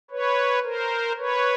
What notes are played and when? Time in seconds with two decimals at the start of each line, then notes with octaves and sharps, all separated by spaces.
0.11 B4 C#5
0.64 A#4 C5
1.18 B4 C#5